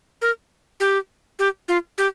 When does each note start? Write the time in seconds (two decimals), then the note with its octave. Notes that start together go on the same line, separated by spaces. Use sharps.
0.22 A#4
0.80 G4
1.39 G4
1.68 F4
1.98 G4